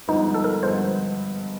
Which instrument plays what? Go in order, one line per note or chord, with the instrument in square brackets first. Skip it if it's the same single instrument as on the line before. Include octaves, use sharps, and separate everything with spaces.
[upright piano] G2 D3 F3 G#3 B3 [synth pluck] D#4
[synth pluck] A4
A#4
[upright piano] G2 D3 F3 G#3 B3 [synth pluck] C5